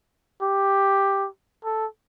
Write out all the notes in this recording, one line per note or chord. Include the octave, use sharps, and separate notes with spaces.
G4
A4